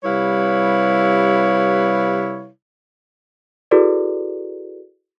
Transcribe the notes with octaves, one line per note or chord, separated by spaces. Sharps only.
C3 G3 E4 B4 C#5 F5
E4 F#4 G#4 A4 B4 D5